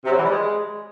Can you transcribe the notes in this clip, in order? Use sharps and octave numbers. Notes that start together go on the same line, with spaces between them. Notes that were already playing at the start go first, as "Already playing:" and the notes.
C3
F#3
E3
G3
G#3